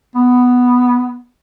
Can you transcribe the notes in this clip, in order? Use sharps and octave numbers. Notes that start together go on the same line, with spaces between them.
B3